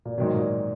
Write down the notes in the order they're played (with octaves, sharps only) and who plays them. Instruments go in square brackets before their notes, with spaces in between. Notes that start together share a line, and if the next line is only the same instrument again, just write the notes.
[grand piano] A#2
[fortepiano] G#2 D#3 F#3 [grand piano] B2
[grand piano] A#2